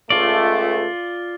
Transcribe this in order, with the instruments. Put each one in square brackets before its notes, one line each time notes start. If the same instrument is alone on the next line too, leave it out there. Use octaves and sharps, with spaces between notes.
[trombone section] C#2 A3 [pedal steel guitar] F4 D5